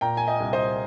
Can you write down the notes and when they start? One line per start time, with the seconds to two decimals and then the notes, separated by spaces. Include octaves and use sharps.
0.01 A#2 G5 A#5
0.17 G#5
0.27 D#5 G5
0.40 C2
0.53 C5 D#5